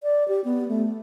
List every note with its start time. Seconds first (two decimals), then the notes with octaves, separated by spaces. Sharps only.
0.03 D5
0.28 G4
0.45 B3
0.68 A3